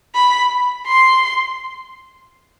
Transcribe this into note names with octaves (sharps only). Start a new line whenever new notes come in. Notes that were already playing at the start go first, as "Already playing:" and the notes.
B5
C6